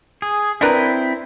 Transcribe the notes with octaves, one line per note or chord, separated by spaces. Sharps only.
G#4
C4 D4 E4 A#4 B4